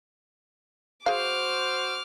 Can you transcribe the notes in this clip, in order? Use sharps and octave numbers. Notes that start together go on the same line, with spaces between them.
F#4 G#4 C5 F5 D6 F6